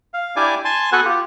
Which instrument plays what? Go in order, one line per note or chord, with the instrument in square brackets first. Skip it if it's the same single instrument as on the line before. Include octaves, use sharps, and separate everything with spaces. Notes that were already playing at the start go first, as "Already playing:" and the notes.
[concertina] F5
D4 E4 G4 D5 G#5 D6
G#5 A5 C6
B3 F#4 A4 B4 F#5 G#5
F4 G4